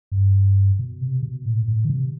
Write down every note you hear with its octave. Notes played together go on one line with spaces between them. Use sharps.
G2
B2
C3
B2
A2
A2
D#3
C3